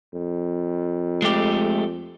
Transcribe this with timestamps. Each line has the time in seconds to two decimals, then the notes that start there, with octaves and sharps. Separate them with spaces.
0.13 F2
1.22 G#3 A3 G4